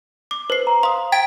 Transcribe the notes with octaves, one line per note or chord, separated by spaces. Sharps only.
D6
B4 C5 C7
A#5
F5 C6 D#6
G5 G#6 A6 B6